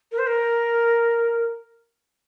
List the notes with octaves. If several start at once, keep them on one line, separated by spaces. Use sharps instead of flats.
A#4
C5
A#4